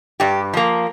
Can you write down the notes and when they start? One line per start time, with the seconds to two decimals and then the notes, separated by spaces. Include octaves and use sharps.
0.20 G2 G4
0.53 F3 A#3